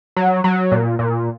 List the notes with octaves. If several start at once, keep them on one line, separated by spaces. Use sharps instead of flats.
F#3
F#3
A#2
A#2